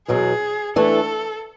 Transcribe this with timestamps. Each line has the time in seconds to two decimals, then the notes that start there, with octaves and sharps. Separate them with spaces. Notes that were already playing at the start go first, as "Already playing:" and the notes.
0.08 E2 B2 F#3 G#4
0.76 E3 A3 D4 A4